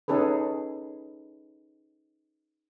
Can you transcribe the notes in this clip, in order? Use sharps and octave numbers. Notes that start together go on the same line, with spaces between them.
C#4 D#4 G#4 A4 B4